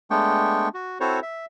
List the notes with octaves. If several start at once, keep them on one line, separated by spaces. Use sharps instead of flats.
G#3 A3 B3 D4 G5 C#6
F#4
C4 E4 F#4 A4 C5 C#5
E5